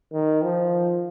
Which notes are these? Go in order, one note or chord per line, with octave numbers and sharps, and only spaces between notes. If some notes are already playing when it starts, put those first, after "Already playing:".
D#3
F3